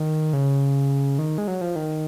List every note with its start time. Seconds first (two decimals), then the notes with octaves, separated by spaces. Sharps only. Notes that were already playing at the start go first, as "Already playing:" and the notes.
Already playing: D#3
0.33 C#3
1.19 D#3
1.38 G#3
1.48 F#3
1.61 F3
1.76 D#3